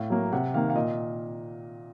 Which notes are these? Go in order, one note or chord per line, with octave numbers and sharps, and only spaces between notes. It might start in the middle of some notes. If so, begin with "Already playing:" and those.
Already playing: A2 F5
F#3 A#3
C3 F#5
D#3 A#3 F5
F5
A#2 D#5